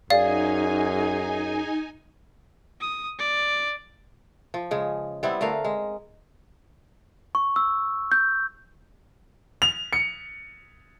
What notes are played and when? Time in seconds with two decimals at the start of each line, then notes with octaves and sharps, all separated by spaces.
0.10 F#2 D#4 G#4 D5 F5 G#5
2.81 D#6
3.19 D5
4.54 F3
4.71 C#3 G#3
5.23 G3 B3 C4 E4
5.41 D3 A3 A#4 F5
5.65 G#3
7.35 C#6
7.56 E6
8.12 G6
9.62 F7
9.93 C#7